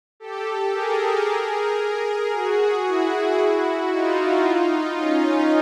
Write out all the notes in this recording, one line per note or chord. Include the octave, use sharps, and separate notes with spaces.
G4 A4
G#4 A#4
G#4 A#4
F#4 G#4
E4 F#4
D#4 F4
C#4 D#4